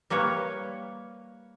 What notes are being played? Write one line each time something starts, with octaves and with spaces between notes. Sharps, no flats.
G3 A#3 B4 C#5